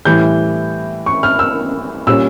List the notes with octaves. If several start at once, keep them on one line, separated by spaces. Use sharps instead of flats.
A2 E3 G3 G6
C#6
F6
E6
A#2 G3 C#4 E6